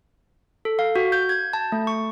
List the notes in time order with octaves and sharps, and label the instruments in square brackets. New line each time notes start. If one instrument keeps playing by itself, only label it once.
[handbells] A4
F5
F#4
G6
G#6
A5
A3
C#6